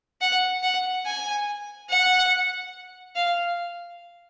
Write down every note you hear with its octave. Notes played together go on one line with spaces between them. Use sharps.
F#5
F#5
G#5
F#5
F5